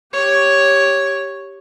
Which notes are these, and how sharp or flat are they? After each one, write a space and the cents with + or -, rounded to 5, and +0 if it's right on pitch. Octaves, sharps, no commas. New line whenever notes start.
G4 +0 C#5 +0